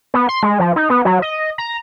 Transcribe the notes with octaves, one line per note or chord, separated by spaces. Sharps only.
B3
C6
G#3
F3
D#4
B3
F#3
D#5
A#5